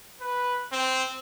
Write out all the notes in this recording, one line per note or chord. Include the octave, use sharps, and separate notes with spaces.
B4
C4